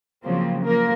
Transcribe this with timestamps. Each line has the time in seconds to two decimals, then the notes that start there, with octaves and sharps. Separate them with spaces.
0.23 C#3 F3 F#3 A#3 C4
0.63 F3 A#3 A#4